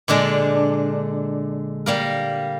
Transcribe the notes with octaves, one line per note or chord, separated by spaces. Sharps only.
A#2 D3 G#3 D4
G3 A#3 A#4